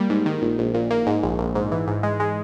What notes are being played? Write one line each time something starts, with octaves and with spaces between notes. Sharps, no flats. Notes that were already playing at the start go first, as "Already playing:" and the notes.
Already playing: G3 A#3
G#2
D#3
A#1
A#1
A#2
A#3
G#2
A#1
A#1
G#2
E3
G#2
G#3
G#3